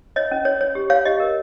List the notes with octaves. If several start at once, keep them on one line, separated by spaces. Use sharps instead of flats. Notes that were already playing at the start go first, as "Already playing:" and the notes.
C#5 D#5
C#4
C#5
C#5
G4
C#5 F5
G4 D#5
A#4